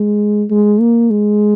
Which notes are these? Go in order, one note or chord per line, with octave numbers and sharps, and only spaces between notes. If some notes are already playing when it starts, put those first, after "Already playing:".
Already playing: G#3
G#3
A#3
G#3